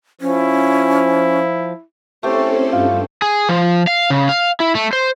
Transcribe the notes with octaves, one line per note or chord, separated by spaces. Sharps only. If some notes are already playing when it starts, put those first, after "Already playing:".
F3 C#4 E4
A3 C4 C#4 E4 G4 A4 C5
G2 F4
G#4
F3
F5
C#3
F5
E4
A3
C5